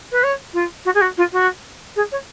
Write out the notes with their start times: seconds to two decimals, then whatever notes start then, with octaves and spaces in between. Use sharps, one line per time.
0.12 B4
0.23 C#5
0.54 F4
0.85 F#4
0.94 G#4
1.01 F#4
1.17 F4
1.33 F#4
1.96 G#4
2.12 C#5